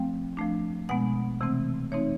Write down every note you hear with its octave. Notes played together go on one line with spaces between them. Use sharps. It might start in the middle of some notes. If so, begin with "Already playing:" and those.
Already playing: F3 A3 C4 G5
F3 A3 D4
B2 G#3 B3 F#5
C3 E3 A3 C4
E3 A3 C4 D#4 C#5